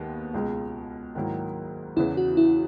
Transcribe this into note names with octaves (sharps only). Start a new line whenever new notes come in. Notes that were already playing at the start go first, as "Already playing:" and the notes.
Already playing: D#2 D#3 G#3 B3
C#2 B2 G#3
G#2 D#3 F#3 A#3 E4
E2 C#3 E3 B3 E4
F#4
E4